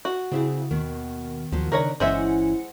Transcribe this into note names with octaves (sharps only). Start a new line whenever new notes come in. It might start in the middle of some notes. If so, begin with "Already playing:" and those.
F#4
C#3 C4 E4 G#4
D#2 B2 D#3
D#2 F3 F#3
C#3 D4 D#4 A#4 B4 C#5 A#5
G1 E3 G#3 C#4 C5 E5 F#5